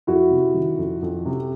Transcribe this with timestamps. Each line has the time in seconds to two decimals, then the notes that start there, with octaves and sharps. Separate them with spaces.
0.07 F2 E4 F#4
0.31 C3
0.54 D#3
0.78 F2
1.02 F2
1.26 C3